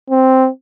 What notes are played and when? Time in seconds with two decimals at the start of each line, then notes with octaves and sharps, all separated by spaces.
0.10 C4